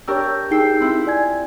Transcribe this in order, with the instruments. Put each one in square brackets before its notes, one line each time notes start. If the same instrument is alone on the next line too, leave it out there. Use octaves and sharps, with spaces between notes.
[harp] D4 G4 A#4 [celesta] C#5 C#6 E6
[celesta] D#4 G#4 C7 [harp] G5 E6
[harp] C4 E4 F4
[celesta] D5 G#5 G#6